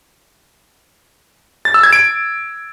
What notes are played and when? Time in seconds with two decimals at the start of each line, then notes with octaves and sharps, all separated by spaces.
1.65 A6
1.74 E6
1.83 G#6
1.93 D7